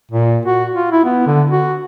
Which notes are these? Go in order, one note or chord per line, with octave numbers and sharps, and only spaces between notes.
A#2
F#4
F4
E4
B3
D3
F#4